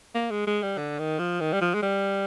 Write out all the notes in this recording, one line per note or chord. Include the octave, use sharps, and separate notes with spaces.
A#3
G#3
G#3
G3
D3
D#3
F3
D#3
G3
F3
G#3
G3